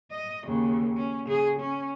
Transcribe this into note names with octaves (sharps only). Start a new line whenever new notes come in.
D#5
D#2 C#3
C#4
C#3 G#4
C#4